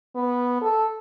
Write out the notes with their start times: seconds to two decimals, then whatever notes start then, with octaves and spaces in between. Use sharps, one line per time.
0.15 B3
0.61 A4